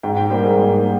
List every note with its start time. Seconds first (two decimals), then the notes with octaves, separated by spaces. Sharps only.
0.03 G#2 G5
0.17 G5
0.30 G3 A#3 C5
0.43 G#4
0.57 G#2
0.84 A#3